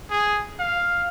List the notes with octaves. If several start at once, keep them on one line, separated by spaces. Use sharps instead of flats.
G#4
F5